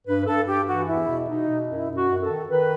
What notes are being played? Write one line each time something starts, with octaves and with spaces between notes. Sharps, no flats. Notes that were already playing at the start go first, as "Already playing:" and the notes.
G2 B4
G2 A4
G2 G4
E3 F#4
E2 E4
B2
B2 D#4
B2
F#2 E4
F#2
F#4
F#2
A4
D#3
D#3 B4